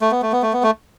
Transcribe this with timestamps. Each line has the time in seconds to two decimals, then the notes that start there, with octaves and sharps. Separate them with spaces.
0.01 A3
0.11 B3
0.22 A3
0.32 B3
0.43 A3
0.53 B3
0.63 A3